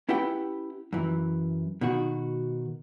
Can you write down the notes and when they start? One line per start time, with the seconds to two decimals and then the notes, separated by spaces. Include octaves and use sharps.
0.09 C#4 E4 G4 B4 F#5 G5
0.93 F#2 E3
1.81 B2 D#3 F#4